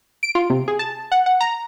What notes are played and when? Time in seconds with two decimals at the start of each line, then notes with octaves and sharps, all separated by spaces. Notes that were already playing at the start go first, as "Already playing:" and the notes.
0.23 D7
0.35 F4
0.50 C3
0.68 G#4
0.79 A5
1.12 F#5
1.26 F#5
1.41 A#5